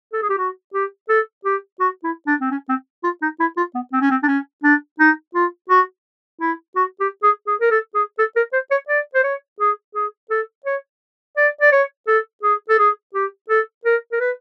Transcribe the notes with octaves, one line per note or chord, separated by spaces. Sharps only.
A4
G#4
G4
F#4
G4
A4
G4
F#4
E4
D4
C4
C#4
C4
F4
D#4
E4
F4
B3
C4
C#4
C4
D4
C#4
D4
D#4
F4
F#4
E4
F#4
G4
G#4
G#4
A#4
A4
G#4
A4
A#4
C5
C#5
D5
C5
C#5
G#4
G#4
A4
C#5
D5
D5
C#5
A4
G#4
A4
G#4
G4
A4
A#4
A#4
B4